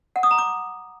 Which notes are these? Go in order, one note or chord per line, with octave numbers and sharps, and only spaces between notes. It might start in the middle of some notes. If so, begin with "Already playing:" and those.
F#5
D#6
A#5
D6